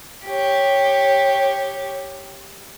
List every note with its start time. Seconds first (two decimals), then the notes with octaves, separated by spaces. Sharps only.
0.25 G4 C#5